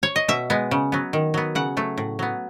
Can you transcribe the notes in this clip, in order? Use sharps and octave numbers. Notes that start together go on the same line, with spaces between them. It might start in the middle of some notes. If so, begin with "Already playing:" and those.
C#5
D#5
B2 E5
G#3 B3
C#3
F#3 B3
D#3
F#3 B3
C#3 F#5
F#3 A3
A2
F#3 B3